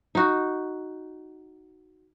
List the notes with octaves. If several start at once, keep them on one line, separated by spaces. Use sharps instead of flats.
D#4 F#4